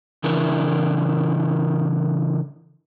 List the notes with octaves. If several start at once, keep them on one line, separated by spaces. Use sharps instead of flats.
C#3 E3 D4 E4 A#4